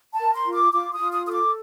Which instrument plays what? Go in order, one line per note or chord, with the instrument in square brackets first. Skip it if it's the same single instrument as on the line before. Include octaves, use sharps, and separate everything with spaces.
[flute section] A5
A#4
C6
F4
D6
F4 D6
D#6
F4
D#6
A4 D#6
D6